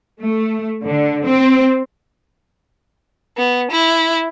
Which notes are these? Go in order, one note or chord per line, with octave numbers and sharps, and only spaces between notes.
A3
D3
C4
B3
E4